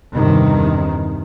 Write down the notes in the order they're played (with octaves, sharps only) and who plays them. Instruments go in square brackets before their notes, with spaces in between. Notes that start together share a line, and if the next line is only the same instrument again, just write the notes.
[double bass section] E2 G2 C3 D#3